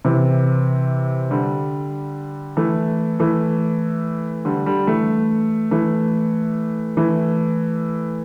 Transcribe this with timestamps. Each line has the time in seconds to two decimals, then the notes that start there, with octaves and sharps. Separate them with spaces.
0.05 C3 E3
1.30 D3 G3
2.57 E3 A3
3.19 E3 A3
4.45 D3 G3
4.66 D3 G3
4.87 E3 A3
5.71 E3 A3
6.97 E3 A3